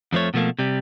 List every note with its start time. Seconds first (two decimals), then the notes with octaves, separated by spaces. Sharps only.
0.13 F2 F3 A3 C#5
0.34 B2 F3 A3 A#3
0.59 C3 G3